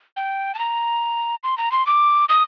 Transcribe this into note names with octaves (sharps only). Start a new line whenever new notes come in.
G5
A5
A#5
C6
A#5
C6
D6
D#6